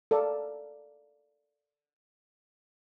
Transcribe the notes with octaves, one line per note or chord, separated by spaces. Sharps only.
A4 A#4 D5 F5